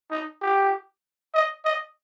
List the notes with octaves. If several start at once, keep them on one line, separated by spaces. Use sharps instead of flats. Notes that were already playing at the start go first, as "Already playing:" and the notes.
D#4
G4
D#5
D#5